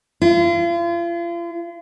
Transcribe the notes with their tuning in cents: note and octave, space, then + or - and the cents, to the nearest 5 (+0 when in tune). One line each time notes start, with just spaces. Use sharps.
F4 -40